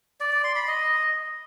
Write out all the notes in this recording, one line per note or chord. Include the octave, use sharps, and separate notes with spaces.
D5
D5
C6
B5
D#5